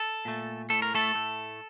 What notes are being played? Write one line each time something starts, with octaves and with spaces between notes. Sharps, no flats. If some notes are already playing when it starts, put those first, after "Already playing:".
Already playing: A4
A#2 A3
A2 A3 A4
A#4
A3 A4
A2 A3